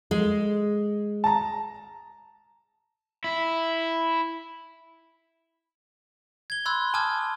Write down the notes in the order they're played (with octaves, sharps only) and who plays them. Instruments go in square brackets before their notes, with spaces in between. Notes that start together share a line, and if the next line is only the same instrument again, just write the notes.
[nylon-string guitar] G#3
[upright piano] A5 A#5
[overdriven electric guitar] E4
[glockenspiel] G#6 G7
B5 C6 E6 F#6 G#6
G#5 A5 D6 D#6 F6 G#6